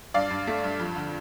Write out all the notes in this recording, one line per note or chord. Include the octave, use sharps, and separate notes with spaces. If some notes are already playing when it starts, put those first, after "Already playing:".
G2 D5 F5
G2
A3
G2
F2
D3